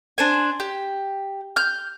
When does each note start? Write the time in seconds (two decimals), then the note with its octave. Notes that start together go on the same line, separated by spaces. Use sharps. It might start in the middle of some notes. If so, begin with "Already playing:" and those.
0.18 D4 C5 G#5
0.60 G4
1.56 F6 G6